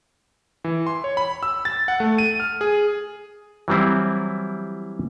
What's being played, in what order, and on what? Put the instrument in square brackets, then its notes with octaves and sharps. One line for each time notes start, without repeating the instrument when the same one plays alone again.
[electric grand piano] E3
C6
C#5
B5
E6
A6
F#5
A3
D#7
F6
G#4
[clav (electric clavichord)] E3 F#3 G3 C4 E4